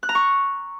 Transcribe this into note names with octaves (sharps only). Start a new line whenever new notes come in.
F#6
A#5
C#6